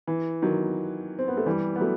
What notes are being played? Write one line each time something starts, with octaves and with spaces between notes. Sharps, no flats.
E3
D#3 F#3
C4
B3
A3
E3 G3
B3
F#3 A3